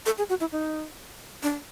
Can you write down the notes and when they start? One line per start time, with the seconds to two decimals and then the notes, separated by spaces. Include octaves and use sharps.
0.06 A4
0.18 G#4
0.29 F#4
0.41 E4
0.52 D#4
1.43 D4